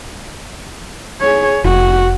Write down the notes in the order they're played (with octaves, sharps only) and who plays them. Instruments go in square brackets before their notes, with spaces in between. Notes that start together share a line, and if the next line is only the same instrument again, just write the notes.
[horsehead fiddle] G#4 C#5
[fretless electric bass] F1 [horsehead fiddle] F#4